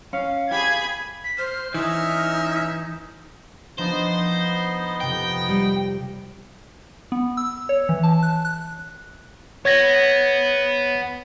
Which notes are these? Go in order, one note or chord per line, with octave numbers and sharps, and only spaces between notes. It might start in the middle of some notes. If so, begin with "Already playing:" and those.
C#4 F5
G4 G#4 B5 G#6
B6
C5 F6
E3 C#4 D#4 E5
F3 B3 D4 D#4 C5 D5 D#5
F1 C3 G5 D6
G3
B3
E6
C#5
E3
A5
F#6
F#6
B3 C#5 G#6 A#6